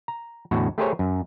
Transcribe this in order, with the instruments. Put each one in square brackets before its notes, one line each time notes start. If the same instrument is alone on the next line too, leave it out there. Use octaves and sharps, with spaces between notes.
[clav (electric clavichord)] A#5
E2 A2 D3 F#4
A3 G4 G#4 A#4 C5 C#5
F#2